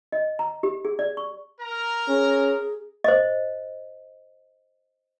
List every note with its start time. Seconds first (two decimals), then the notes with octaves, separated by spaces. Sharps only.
0.12 D#5
0.39 A#5
0.63 G4
0.85 G#4
0.99 D5
1.17 C#6
1.60 A#4 A#5
2.08 C#4 G#4
3.04 C5 D#5